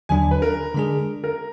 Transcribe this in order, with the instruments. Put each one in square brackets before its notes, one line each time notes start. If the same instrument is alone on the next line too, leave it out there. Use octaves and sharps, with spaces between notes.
[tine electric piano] D#2 D3 F#3 D4 [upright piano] G#5
[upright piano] B4
A#4
[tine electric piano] D3 G#3 D4 G#4
[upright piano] A#4